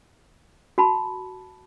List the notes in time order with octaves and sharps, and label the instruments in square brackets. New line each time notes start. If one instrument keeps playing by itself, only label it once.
[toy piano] F#4 A5 B5